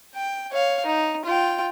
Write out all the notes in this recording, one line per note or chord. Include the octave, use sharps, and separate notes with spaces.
G5
C#5 F5
D#4
F4 G5